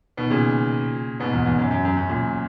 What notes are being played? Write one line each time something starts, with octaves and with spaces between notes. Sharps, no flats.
B2 D#3
A#2 C#3
G#2 B2
E2 G#2
E2
F#2
F#2
F#2
F#2
F#2 A#2